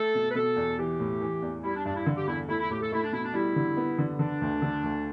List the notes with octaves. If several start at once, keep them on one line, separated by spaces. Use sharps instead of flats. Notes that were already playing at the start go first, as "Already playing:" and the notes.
Already playing: A3 A4
B2
B4
B2 A4
E2
E3 G4
A2
E3
E2
G3 E4
D4
G2 D4
E4
D3
G4
E2 E4
A3 E4
E4
A2 G4
A4
A3 E4
D4
B2 E4
D4
G3 E4
D3
B3
D3
D3 D4
D2
D3
D2